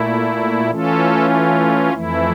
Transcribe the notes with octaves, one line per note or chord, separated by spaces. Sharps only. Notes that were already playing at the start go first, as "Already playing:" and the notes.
Already playing: A#2 A3 E4
E3 A3 C#4 F4 A4
F2 E3 A3 E4